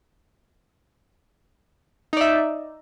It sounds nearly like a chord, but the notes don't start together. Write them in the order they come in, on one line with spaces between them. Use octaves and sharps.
D#4 D5 E5